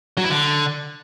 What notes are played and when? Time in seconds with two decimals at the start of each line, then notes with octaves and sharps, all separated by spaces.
0.17 F#3
0.24 E4
0.30 D3